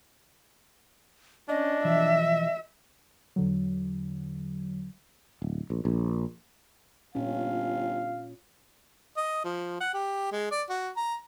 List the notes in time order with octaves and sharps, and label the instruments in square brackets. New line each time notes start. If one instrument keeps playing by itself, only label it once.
[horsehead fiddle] C#4 [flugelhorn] D4 [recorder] D#5
[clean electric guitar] B1 E3 F3 [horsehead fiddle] E5
[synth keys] E2 D3 F#3
[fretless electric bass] D1
A#1
A#1
[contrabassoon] G1 [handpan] A#2 C#4 [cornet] F5
[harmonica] D#5
F3
F#5
G4
G#3
D5
F#4
A#5